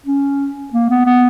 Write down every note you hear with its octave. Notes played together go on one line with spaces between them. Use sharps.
C#4
A#3
B3
B3